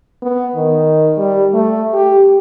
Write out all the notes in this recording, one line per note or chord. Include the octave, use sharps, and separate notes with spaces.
B3
D#3
G3
A3
G4